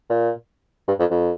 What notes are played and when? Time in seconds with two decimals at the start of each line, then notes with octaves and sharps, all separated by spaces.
0.10 A#2
0.88 G2
0.99 F2
1.10 F2